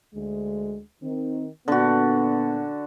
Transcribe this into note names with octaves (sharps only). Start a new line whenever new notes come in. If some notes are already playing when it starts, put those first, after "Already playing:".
D2 G#3
D#3 C4
A#2 D3 B3 F#4